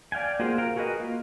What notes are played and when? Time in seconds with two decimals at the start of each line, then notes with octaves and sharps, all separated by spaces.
0.12 D5 F5 G5 G#5
0.39 A#3 F4 F#4 G#4 C5
0.58 A#4 F5 G5
0.76 F#4 G#4 A#4 B4 D#5
1.00 A#3 F4